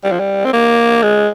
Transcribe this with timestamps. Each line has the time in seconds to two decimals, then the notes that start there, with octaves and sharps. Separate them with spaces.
0.04 G3
0.12 F3
0.20 G3
0.45 C4
0.53 A#3
1.03 G#3